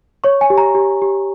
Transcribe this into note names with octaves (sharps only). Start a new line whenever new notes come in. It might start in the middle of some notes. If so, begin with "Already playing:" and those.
C#5 C#6
G#5
G4
A#5
G4
G4